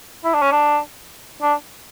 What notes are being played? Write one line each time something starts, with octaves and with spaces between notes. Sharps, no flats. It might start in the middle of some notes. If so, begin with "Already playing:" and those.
E4
D4
C#4
D4
D4